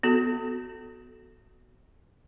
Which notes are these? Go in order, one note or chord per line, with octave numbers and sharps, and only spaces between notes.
B3 F#4 A4